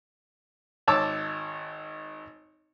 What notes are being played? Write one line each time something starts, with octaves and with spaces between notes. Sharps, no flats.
G#1 C#5 A5 D6 E6